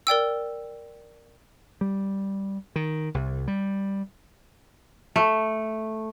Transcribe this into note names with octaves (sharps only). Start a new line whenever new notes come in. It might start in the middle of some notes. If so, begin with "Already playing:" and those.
A#4 D5 G5 E6
G3
D#3
C2
G3
A3